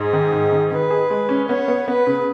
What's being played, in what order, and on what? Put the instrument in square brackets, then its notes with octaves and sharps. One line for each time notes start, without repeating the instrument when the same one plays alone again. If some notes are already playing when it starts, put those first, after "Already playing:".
Already playing: [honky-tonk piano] G#2 [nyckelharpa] G#4
[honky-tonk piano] D#3
G#2
D#3
[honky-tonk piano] D#3 [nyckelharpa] B4
[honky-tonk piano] G#4
G#3
C#4
[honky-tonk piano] B3 [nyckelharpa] C#5
[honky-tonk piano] B3
[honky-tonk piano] B3 [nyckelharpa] B4
[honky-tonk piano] C#3